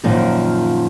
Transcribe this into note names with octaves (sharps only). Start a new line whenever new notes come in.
F#2 A#2 D#3 F3